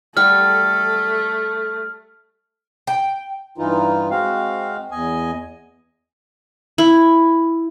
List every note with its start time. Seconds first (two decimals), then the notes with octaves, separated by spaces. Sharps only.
0.17 G3 A3 A4 F#5 C#6 F6
2.87 G5
3.58 G2 E3 D#4 F4
4.10 G#3 C4 F#4 F5
4.91 E2 D#5 G#5
6.78 E4